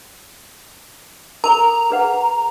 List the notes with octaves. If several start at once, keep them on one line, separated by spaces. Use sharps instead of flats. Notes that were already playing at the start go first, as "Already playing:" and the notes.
A4 A#4 A#5
G#4 B4 F#5